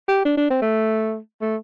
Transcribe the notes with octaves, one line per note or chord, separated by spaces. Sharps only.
G4
D4
D4
C4
A3
A3